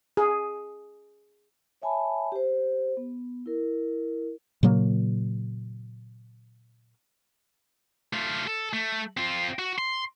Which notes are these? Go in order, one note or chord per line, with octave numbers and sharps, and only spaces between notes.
G#4
C#5 E5 G#5 A5 B5
G4 C5
B3
E4 A#4
A#2 C#3 F#3 A#3
A3 F4
A4
A3
C4 F4
F#4
C6